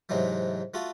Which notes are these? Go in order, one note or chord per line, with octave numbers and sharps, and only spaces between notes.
G#2 C3 E3 F#3 G#3 A3
A3 F4 F#4 A4